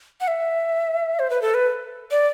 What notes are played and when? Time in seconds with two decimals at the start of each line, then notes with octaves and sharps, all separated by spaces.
0.21 F#5
0.28 E5
1.19 C5
1.30 B4
1.42 A4
1.54 B4
2.11 D5